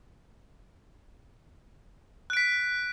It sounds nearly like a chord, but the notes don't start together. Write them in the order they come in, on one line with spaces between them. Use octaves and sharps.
F#6 D7 B6